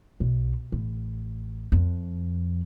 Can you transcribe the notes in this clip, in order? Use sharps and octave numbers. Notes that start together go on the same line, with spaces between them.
B1
A1
F2